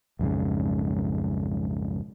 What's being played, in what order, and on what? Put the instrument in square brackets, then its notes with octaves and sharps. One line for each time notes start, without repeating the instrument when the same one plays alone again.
[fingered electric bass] B1 F2 G#2 C#3